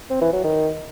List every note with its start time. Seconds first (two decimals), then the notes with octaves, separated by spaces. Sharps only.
0.10 C4
0.22 E3
0.33 F#3
0.44 D#3